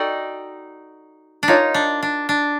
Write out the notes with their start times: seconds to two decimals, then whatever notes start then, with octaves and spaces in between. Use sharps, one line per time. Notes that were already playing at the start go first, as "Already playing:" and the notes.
Already playing: D#4 F#4 A4 D5 G5
1.43 D4
1.48 D#4 F4 A#4 C#5 F5
1.74 D4
2.02 D4
2.29 D4